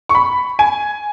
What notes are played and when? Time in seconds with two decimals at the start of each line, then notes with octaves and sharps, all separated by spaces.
0.09 C#6
0.15 B5
0.59 G#5